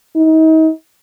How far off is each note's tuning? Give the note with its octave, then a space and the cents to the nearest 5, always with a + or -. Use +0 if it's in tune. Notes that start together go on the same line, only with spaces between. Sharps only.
D#4 +35